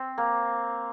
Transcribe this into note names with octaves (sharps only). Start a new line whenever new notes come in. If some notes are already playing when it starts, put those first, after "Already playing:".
Already playing: C4
A#3